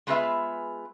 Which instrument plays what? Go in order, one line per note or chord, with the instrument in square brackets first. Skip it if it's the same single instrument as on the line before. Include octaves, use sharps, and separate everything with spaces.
[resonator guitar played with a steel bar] G#3 B3 F4 G#4 B4 E5